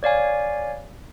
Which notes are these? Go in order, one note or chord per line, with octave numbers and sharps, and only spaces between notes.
C#5 D5 F5 G#5